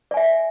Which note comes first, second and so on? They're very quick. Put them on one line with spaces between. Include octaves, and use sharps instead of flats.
D5 G#5 E5